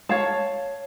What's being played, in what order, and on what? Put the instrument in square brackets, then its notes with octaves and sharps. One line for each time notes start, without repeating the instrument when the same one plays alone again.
[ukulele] C#5 F5 A5